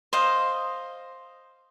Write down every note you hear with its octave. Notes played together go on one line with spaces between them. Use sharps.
C5 D#5 F5